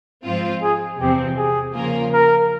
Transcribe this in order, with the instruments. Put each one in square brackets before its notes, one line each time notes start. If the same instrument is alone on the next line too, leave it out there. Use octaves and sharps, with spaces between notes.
[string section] G#2 F3 C4 F4
[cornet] G#4
[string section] E2 C3 F3 C4 [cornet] G4
[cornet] G#4
[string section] C#3 F3 A#3 F4 A#4
[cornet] A#4